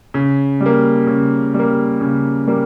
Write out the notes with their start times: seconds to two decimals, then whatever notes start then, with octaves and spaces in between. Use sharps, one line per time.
0.14 C#3
0.61 G3
0.66 A#3
1.07 C#3
1.54 G3 A#3
2.01 C#3
2.48 G3 A#3